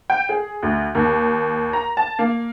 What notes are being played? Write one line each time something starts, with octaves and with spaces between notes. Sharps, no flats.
G5
G#4
D2
D#2
A#5
A5
A#3